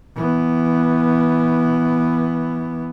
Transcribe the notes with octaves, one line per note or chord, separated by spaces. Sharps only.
E3 B3